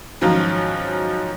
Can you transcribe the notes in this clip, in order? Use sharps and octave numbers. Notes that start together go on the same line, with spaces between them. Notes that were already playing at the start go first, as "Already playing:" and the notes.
G#2 D#3 F3 F#3 C#4 F4